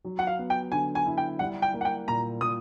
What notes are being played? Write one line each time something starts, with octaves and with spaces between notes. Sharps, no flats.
F#3
F#5
F5
B3
G5
D3 G#5
G#5
E4
G5
G3 F#5
G5
A#3
F#5
G5
A#2 A#5
A#2 D#6